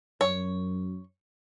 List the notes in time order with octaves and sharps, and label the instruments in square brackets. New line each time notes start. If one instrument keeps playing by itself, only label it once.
[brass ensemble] F#2 [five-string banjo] C#5